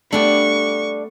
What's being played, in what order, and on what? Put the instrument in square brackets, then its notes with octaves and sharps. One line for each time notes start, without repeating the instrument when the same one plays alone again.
[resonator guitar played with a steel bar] G3 D4 [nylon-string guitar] A3 B3 G4 [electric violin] C#6